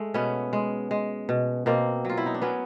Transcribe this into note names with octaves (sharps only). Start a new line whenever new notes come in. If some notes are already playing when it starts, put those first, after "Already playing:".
Already playing: G#3 A3
B2 B3 C#4
G#3
G#3
B2
B2 A#3 C4
F#3 F4
E4
D#4
D4
F#3 B3 C#4